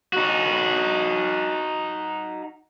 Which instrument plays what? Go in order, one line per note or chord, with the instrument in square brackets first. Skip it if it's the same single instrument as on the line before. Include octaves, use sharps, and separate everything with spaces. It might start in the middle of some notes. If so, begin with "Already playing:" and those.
[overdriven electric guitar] D#4 F#4